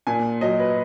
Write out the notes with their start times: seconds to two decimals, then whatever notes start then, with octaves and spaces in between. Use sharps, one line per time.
0.07 A#2 G#5
0.41 F#3 D#5
0.60 B4